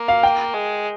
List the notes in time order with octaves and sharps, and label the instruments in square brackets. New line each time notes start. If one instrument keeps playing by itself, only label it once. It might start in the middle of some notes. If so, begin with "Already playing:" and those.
Already playing: [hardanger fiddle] A#3
[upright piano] F5
G5
[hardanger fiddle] G#3